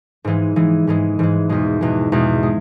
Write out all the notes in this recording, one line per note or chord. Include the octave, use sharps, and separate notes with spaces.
G#2 E3 G#3
G#2 E3 G#3
G#2 E3 G#3
G#2 E3 G#3
E2 B2 G#3
E2 B2 G#3
E2 B2 G#3
G#3